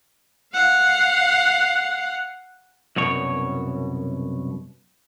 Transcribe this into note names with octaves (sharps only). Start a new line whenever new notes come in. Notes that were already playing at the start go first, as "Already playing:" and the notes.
F5 F#5
C2 F#2 B2 C#5